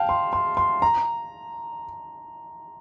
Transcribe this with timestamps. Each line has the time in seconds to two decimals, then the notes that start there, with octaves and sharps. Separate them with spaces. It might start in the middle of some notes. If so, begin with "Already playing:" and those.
Already playing: F5 G5 A5
0.09 C6
0.33 C6
0.57 C6
0.82 A#5